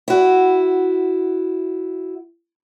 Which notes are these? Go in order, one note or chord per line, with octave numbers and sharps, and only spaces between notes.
E4 F#4